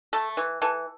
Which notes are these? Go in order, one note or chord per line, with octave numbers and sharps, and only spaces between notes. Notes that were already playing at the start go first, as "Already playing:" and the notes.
A3 A4
E3
E3 A4